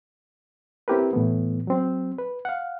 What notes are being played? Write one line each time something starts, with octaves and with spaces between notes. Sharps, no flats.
C4 E4 G4 A#4 B4
A2 E3 A3 B3
F#3 C4
B4
F5 F#5